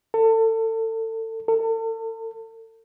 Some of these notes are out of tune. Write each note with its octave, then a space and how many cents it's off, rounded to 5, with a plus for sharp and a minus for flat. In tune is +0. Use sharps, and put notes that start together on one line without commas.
A4 +30
A4 +40